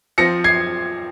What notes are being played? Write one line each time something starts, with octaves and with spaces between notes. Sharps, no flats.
F3 C4 A#6 C#7
G#6 C7